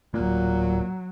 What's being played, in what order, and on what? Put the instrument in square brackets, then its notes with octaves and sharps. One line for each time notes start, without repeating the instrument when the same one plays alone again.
[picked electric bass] D1 G#1 A#3 [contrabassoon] A#2 [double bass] F#3